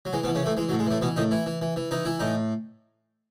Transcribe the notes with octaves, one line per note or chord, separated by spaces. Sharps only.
F#3
E3 G#3
B2 B3
E3
C#3 C#4
A2 E3 A3
E3 G#3
F#3
A2
G#3
A2 E3 A3
B2 E3 B3
A2 D#3 D#4
E3 E4
E3
E3
E3
E3 D#4
E3 E4
A2 D#4